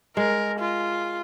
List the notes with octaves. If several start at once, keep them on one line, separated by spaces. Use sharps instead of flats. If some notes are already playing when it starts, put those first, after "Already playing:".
G#3 A#4
F4